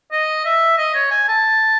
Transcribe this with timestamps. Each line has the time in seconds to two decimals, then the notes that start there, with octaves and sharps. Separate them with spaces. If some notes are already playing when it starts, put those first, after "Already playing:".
0.12 D#5
0.45 E5
0.78 D#5
0.94 C#5
1.11 G#5
1.29 A5